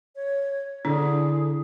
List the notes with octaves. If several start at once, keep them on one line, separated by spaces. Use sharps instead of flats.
C#5
D3 D4 E4 G#4